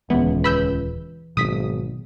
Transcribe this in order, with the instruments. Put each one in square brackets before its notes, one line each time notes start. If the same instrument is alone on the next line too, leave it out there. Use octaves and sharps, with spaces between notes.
[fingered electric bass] D#1 G#3 [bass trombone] C#2 [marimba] E3 [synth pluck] B3
[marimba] B4 [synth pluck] B5 E6 G6
[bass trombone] G#1 [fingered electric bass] B2 D#3 F#3 [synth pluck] D#6 B6